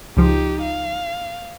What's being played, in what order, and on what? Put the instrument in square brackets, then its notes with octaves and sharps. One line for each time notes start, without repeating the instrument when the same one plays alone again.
[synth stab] C#2 F3 [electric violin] D#4 G4
[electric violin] F5